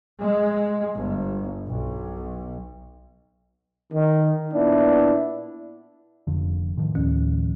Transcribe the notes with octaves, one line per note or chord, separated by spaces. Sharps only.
G#3
G1
B1
D#3
A#2 B3 D4 E4
F1 F2 D3
A2 D#3 F3
D2